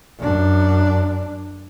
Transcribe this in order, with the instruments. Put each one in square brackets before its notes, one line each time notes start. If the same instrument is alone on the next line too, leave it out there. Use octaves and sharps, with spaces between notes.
[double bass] F#2 D4